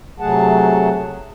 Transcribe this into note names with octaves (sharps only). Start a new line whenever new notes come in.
C3 F#3 A3 G#4 F#5 A5